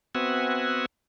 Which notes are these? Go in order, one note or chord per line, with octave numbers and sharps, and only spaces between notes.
B3 C4 F#4 E5 F#5 G#5